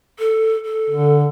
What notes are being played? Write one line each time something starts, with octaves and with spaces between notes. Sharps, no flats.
A4
A4
D3